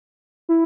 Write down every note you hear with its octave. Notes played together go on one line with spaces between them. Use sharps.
E4